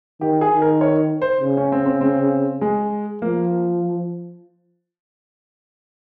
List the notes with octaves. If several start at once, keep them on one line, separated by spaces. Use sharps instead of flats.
D#3 G4
G#4
D#3
A#4
C#5
C5
C#3
C#4
C4
C4
C4
G#3
F3 A#3